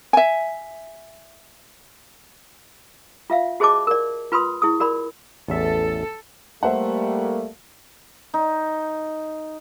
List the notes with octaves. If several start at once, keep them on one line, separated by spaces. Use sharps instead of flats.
E5 G#5
F4 E5 F5
F#4 G#4 C5 D#5 A5 D6
A#4 D5
F4 B4 B5 C6 D#6
E4 G#4 D#6
F#4 A#4 D5 B5
A1 E2 A4 E5
G3 A3 A#3 C5 E5 F#5
D#4